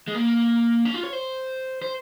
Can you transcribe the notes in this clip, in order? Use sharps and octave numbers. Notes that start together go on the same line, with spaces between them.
G#3
A#3
C#4
F4
C#5
C5
C5